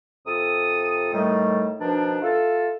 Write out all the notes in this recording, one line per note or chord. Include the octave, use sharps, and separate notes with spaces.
F2 C3 A4 D#6
A2 D#3 G3 A3
B2 D#3 F3 D4
E4 F4 A4